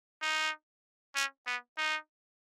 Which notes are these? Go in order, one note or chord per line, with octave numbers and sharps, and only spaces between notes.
D#4
C#4
B3
D#4